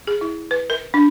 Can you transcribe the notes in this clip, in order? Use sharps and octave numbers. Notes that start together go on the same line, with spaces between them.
G#4
E4
B4
A#4
D4